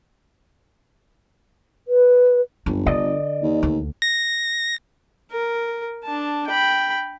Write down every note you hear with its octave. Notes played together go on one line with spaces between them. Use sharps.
B4
G1 F#2
D3 D5 D#5
D#2
D2
A#6
A#4
D4 A5
G5 B5